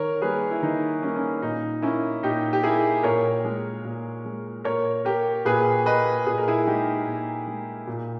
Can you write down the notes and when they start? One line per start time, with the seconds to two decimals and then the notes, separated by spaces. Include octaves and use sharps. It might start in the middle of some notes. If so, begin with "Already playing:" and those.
Already playing: D#3 A#4 C#5
0.22 G3 A#3 G#4 B4
0.51 E4
0.62 D#3 D#4
1.02 G3 C#4
1.06 A#3
1.16 C#4
1.42 A#2 D#4
1.82 A#3 C#4 E4
2.23 A#2 D#4 G4
2.53 G4
2.63 A#3 E4 G#4
3.03 A#2 A#4 C#5
3.44 G#3
3.85 A#2
4.25 G#3
4.64 A#2 A#4 C#5
5.05 A#3 G4 A#4
5.45 A#2 G#4 B4
5.85 A#3 B4 D#5
6.26 A#2 G#4
6.38 A#4
6.48 E4 G#4
6.66 G#3 D#4 G4
7.06 A#2
7.47 G#3
7.87 A#2